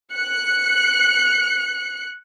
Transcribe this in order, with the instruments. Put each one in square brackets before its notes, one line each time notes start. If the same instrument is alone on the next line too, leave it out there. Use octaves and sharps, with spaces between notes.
[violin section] F#6 C#7